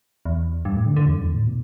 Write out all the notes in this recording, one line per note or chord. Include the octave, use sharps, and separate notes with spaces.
E2
G2
A2
D3
D3
E2
G2
E2
A2
B2